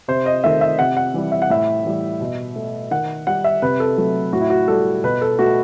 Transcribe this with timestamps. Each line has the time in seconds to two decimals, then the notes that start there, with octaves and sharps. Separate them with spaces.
0.08 C3 C5
0.26 D#5
0.44 D#3 A3 E5
0.61 E5
0.79 C3 F#5
0.97 F#5
1.14 E3 G3
1.32 E5
1.42 F#5
1.50 A2 E5
1.85 E3 G3
2.21 B2
2.56 A3
2.91 D#3 F#5
3.27 G3 F#5
3.44 E5
3.62 C3 B4
3.80 A4
3.98 F#3 A3
4.33 A2 F#4
4.41 E4
4.50 F#4
4.68 G3 A4
5.04 B2 B4
5.22 A4
5.39 A3 F#4